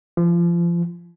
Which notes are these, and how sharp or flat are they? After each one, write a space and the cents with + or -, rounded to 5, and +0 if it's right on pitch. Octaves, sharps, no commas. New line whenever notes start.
F3 -30